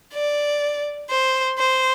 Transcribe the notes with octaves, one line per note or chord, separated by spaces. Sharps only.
D5
C5
C5